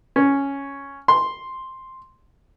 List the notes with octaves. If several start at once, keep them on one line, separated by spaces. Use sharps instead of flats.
C#4
C6